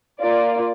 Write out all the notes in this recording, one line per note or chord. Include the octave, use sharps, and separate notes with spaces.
A#3 F4 D5